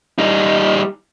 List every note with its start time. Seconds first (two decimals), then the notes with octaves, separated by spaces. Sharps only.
0.19 G3 D#4